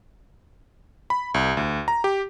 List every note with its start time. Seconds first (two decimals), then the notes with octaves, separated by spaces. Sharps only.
1.10 B5
1.34 C2
1.57 D2
1.88 A#5
2.04 G4